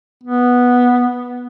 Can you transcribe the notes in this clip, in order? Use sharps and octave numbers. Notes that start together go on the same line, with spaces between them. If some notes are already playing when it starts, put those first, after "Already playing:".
B3